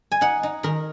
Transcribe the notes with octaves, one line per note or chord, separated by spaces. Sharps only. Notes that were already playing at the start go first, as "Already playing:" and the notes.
G#5
D#4 F#5
D#4
D#3 A#4